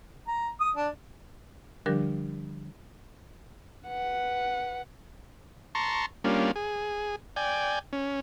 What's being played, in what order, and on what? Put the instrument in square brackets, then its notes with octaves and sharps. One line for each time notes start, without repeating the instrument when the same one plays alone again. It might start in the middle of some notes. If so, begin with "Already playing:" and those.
[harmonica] A#5
D#6
D4
[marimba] D3 F3 G3 D4 G4 A#4
[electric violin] B4 F#5
[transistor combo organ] A5 A#5 C6 C#6
G3 A#3 C#4 D4 F4
G#4
D5 G5 G#5
C#4